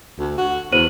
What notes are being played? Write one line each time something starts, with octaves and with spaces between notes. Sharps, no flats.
D2
F#4
E2 C5 D#7 F#7